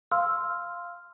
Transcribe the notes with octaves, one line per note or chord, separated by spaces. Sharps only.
F5 C6 E6 F6